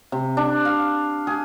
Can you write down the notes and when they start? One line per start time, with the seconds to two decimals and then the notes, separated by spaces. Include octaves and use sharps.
0.12 C3
0.37 D4
0.65 F5
1.27 G#4